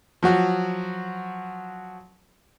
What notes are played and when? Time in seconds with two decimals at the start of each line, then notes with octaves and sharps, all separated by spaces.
0.23 F3 F#3 F#4